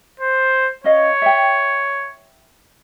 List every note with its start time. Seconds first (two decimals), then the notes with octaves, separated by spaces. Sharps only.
0.20 C5
0.84 C#4 C#5 D#5 F5
1.22 E5 G5